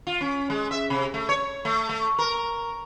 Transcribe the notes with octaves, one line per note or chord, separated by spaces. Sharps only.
F4
C#4
G#3
E5
C3
A3
C#5
A3
A3
A#4